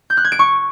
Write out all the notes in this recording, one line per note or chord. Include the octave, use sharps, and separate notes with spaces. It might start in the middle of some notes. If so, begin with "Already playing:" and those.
G6
F#6
G#6
D7
C#6